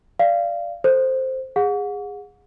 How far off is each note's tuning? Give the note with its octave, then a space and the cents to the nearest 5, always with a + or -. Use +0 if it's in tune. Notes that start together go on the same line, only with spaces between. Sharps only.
D5 +0 F5 -20
A4 +0 C5 +0
G#4 -25 F#5 -35